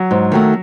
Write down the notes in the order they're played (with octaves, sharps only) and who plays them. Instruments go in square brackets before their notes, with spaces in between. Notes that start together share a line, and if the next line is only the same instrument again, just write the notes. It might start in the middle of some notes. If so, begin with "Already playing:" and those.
Already playing: [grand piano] F#3
[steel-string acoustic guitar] G#2
D#3 F#3 A3